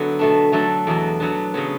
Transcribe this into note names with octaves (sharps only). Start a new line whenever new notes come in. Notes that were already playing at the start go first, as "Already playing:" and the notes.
Already playing: D3 F#3 B3 E4 F#4 A4
B2 A3 D4
F#3 A3 D4 A4
E2 B2 F#3
F#3 B3 D4
C#3 F#3 B3